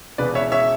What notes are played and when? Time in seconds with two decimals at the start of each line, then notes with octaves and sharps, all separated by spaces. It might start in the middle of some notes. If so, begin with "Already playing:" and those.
0.18 E1 E2 C#3 B4 D5
0.35 C#5 E5
0.52 C#5 E5